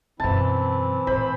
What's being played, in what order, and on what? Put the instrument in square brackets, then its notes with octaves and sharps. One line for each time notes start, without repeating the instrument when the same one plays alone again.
[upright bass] F#2 B2 [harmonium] E3 C4 E4 [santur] A5
[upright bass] A1 A#2 [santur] C5 B5